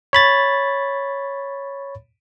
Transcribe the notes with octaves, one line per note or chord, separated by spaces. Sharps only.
C#5 B5 A6